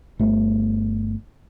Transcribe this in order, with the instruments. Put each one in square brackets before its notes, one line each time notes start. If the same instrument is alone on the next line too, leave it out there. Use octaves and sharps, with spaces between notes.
[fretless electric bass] G1 A3